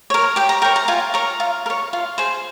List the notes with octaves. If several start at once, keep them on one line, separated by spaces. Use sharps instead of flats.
A#4 C#5
G4 G5
A#5
A#4 C#5 G5
A#5
F4 G#5
A#4 C#5 A#5
F4
A#4
C#5
F4
G#4 C5